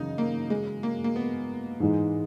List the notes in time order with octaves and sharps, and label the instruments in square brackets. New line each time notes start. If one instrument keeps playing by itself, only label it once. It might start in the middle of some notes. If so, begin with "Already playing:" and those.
Already playing: [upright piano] F#2 C#3 E3 [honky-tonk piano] D#4
[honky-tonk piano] A#3
G#3
A#3
A#3
B3
[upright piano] G#2 E3 G#3 D#4